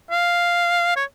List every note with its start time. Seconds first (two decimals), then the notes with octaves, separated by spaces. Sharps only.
0.11 F5
0.96 C#5